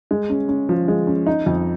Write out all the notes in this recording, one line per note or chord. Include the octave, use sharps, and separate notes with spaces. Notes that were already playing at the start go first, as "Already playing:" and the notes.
G#3
C#4
C#4
F3
G#3
C#4
D#4
F2